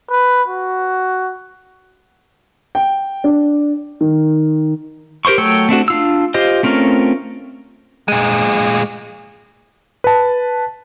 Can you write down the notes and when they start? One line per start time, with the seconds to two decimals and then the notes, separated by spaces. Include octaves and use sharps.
0.10 B4
0.48 F#4
2.75 G5
3.24 D4
4.01 D#3
5.25 G4 A#4 C5 C6 C#6
5.38 F#3 A3 C#5 G5 E6
5.69 A3 C4 D4 F#4
5.88 D4 F4 E6
6.34 F4 G4 C5 D#5
6.63 A3 C4 C#4 F4 A#4
8.08 A#2 G#3
10.04 B4 A5